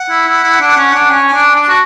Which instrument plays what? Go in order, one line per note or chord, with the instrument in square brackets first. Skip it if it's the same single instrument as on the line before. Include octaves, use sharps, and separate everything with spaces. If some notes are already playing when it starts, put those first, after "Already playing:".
Already playing: [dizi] F#5
[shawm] E4
E4
E4
D4
C#4
D4
[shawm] C#4 [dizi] G#5
[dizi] G#5
[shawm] D4
[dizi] A5
[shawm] D4
[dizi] A5
[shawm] F#4